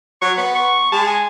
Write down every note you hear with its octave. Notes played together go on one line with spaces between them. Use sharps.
F#3 C#6
B3 B4
C#6
G#3 A5
G#5